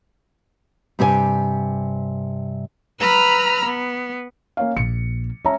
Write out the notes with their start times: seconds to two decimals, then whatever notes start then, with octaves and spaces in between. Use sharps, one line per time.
0.99 G2 C3 G4 B4 G#5
2.98 B4 A#5 B5 E6 F6
3.65 B3
4.57 A#3 C#4 F5
4.77 A#1 A#3 C#7
5.45 G#3 C#4 E5 A#5